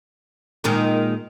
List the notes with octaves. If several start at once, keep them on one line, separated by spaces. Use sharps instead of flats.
A#2 D#3 G#3